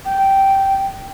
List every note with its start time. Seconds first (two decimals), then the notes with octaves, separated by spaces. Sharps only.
0.05 G5